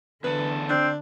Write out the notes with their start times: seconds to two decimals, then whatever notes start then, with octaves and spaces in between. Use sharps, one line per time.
0.24 E2 D3 A4 B4
0.70 C4 D4